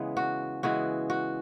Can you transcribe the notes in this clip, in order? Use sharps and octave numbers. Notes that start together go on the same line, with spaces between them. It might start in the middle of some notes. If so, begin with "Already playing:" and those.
Already playing: C#3 E3 G#3 B3
F#4
C#3 E3 G#3 B3 F#4
F#4